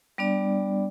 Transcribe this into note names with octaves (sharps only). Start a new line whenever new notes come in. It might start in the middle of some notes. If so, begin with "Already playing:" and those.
G3 B3 D4 D5